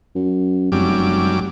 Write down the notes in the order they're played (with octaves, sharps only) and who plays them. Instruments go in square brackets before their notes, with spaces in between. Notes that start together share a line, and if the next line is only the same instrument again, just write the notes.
[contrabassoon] F#2
[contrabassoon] F1 [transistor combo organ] F#2 G3 D6